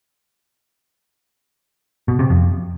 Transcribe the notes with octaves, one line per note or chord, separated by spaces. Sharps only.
B2
C3
F2